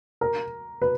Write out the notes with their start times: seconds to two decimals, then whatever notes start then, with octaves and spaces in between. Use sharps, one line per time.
0.21 A#4
0.82 B4